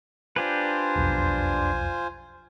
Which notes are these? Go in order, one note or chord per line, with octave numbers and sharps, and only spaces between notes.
D4 F4 G4 B4 C5 G#5
E1 B1 F2